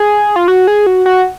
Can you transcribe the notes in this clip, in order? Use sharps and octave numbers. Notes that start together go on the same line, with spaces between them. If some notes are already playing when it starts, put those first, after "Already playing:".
Already playing: G#4
F4
F#4
G#4
F#4
F#4